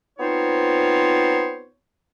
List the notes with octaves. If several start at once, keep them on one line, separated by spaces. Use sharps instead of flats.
B3 C4 D#4 F4 C5 C#5